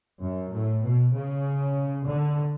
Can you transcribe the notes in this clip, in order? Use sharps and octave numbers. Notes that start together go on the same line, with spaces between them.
F#2
A2
B2
C#3
D3